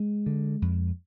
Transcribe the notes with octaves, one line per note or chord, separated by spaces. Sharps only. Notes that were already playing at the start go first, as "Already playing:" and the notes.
Already playing: G#3
D3
F2